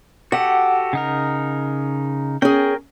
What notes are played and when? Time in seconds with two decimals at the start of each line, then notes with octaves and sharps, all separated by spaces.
0.32 F#4 G4 A4 F#5
0.93 C#3 D#4 A#4
2.42 C#4 G#4 A#4 G5